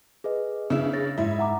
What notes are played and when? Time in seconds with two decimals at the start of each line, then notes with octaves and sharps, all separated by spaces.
0.24 G#4 B4 D#5
0.70 C#3 D4 E4 E5
0.93 C#5 A6 A#6
1.18 G#2 D#4 E4
1.39 F#5 A#5 D6